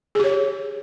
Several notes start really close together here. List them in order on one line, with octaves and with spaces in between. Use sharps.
G#4 G4 C#5